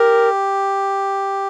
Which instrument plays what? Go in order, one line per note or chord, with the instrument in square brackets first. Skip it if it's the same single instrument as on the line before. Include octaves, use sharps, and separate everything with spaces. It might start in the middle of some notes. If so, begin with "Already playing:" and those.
Already playing: [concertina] G4 [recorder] A#4